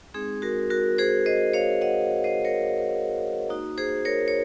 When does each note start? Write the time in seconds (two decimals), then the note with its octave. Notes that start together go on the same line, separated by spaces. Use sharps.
0.14 G#3 C4 D#4 G#4
0.42 F#4 A#4
0.70 F#4 A#4
0.98 G#4 C5
1.26 C5 D#5
1.53 C#5 F5
1.81 D#5 F#5
2.24 C5 D#5
2.45 A#4 C#5
3.49 A#3 D#4 F#4
3.78 G#4 C5
4.05 A#4 C#5
4.28 C#5